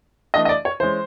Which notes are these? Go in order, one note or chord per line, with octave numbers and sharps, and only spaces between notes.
E3 A3 D4 D#5
D#5
D5
C#5
E3 G#3 C#4 C5